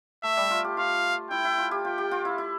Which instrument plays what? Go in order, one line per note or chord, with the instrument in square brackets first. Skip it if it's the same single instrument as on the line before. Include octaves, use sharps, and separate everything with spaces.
[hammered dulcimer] A3 [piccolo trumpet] E5
[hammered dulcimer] G3
F4
G4
[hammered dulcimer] F4 [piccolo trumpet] F5
[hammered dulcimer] E4 [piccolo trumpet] G5
[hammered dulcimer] E4
F4
G4
[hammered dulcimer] F4 [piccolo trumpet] G5
[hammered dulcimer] G4
F4
E4
E4